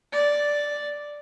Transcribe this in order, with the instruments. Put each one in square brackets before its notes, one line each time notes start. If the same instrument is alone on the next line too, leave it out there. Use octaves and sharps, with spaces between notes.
[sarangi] D5